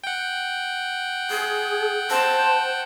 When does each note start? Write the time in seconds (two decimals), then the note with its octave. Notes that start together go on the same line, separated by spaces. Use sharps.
0.04 F#5 G5
1.30 G#4
2.10 C5 A5